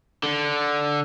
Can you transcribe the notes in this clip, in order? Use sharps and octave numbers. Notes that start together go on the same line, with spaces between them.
D3